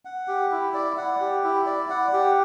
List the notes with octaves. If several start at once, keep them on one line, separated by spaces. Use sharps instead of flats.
F#5
G4
E4
D5
F#5
G4
E4
D5
F#5
G4